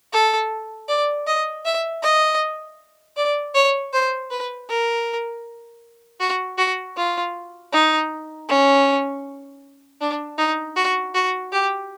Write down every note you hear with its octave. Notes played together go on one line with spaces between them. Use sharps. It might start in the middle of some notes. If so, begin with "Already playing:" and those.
A4
D5
D#5
E5
D#5
D5
C#5
C5
B4
A#4
F#4
F#4
F4
D#4
C#4
D4
D#4
F#4
F#4
G4